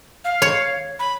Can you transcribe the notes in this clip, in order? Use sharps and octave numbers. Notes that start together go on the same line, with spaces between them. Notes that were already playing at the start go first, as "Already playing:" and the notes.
F5
C#5
B5